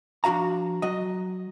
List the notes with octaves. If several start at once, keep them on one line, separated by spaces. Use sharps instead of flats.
F3 D4 F#4 F5 A#5
F#3 F#4 D#5